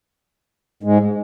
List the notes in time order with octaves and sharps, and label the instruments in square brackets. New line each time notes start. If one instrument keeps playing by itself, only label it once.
[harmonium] G#2 G#3